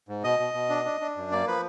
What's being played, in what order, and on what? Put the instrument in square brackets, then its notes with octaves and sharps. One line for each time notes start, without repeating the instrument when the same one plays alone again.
[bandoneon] G#2
B2 D#5
B2
B2
D4
D4
D4
F#2
A#3 D5
F3 B4